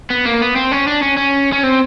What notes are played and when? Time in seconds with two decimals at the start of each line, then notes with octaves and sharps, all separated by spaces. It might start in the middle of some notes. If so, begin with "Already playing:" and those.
0.10 B3
0.26 A#3
0.41 B3
0.56 C4
0.72 C#4
0.87 D4
1.02 C#4
1.17 C#4
1.53 C#4
1.63 C4